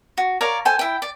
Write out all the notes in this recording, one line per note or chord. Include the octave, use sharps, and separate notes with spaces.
F#4
A#4 C#5 D5 F5
A4 C5 G5 G#5
E4 G5
D5